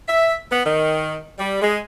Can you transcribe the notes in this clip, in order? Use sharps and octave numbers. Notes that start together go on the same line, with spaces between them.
E5
B3
D#3
G3
G#3